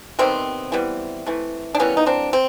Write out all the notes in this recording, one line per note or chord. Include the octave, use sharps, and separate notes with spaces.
C3 D#3 G3 B3 C4
E3 G3 B3
E3 A3
D4
E3 G3 A#3 B3 C#4
D#4
C4 D4
C4